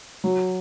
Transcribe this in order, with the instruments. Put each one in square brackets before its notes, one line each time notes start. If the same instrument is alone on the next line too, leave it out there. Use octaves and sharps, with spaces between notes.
[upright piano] F#3